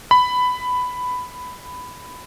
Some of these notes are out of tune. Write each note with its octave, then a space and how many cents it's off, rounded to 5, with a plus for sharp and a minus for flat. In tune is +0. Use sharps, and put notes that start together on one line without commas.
B5 +10